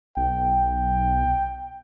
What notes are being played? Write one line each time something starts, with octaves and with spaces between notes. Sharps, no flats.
B1 G5